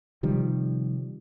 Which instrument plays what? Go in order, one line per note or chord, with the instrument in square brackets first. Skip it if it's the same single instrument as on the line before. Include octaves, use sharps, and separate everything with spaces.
[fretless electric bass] C3 D#3 F3 G3